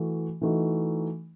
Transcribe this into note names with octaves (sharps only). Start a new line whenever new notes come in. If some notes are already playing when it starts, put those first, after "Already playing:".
Already playing: E3 A3 F#4
E3 A3 D#4 F#4